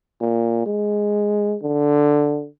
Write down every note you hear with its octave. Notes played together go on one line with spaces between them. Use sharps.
A#2
G#3
D3